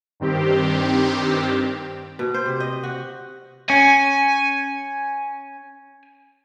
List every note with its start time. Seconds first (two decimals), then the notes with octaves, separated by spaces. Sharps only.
0.20 G2 D#3 C4 G4
2.19 B2
2.34 C5
2.46 C3
2.60 D#5
2.83 F#4
3.70 C#4 G#5